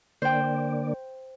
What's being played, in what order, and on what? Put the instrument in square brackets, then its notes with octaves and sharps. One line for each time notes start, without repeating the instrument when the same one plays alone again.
[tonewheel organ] D3 A#3 D5 [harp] C5 G5